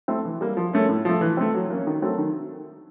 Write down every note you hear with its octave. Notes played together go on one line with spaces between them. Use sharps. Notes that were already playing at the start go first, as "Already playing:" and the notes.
A3 C4 E4
E3
G3 A#3
F3
A3 C#4
A2
F3 A3
E3
A3 C4
F#3
A#3 C#4
D#3
F#3 A3 C4
D#3